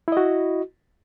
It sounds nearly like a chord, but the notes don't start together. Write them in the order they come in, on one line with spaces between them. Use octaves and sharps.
E4 D#5 F#4